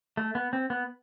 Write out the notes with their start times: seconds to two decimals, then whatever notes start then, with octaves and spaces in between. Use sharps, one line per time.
0.17 A3
0.35 B3
0.53 C4
0.70 B3